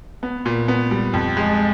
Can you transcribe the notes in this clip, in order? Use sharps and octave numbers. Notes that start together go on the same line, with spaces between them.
B3
A#2
B3
G3
F2
G#3